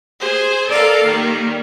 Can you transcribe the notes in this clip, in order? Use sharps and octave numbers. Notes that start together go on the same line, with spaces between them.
G#4 C5
A4 A#4 D5 F5
D#3 G3 A#3